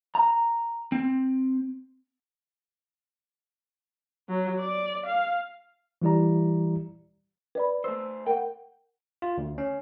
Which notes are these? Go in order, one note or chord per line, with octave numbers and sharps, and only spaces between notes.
A#5
C4
F#3
D5
F5
E3 G3 E4 G4 D5 A#5
B4 D5 B5
A3 C5 E6
A#4 F#5 G5
F4
D2
C#4